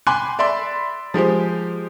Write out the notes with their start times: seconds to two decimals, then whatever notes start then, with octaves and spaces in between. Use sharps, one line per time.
0.07 G5 G#5 B5 C6 D6 F#6
0.39 D5 E5 B5 C6
1.14 F3 G#3 G4 C5